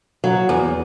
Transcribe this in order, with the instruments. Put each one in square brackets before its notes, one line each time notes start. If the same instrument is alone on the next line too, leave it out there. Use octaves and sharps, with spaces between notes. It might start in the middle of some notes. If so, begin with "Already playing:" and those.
[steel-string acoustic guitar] F#3
E2